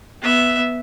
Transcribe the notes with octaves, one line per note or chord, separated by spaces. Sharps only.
B3 E5